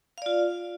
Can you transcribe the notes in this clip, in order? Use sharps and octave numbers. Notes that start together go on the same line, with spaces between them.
F4 D5 F5